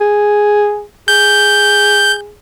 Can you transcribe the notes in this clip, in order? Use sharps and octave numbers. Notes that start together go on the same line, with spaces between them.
G#4
G#4 G6